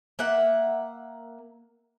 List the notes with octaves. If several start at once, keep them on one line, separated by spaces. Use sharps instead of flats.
A#3 E5 F#5